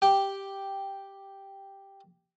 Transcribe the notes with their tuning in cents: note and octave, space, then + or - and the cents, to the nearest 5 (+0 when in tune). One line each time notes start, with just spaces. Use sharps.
G4 +0 G5 +0